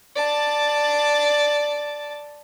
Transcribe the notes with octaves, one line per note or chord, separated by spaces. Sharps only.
D5 A5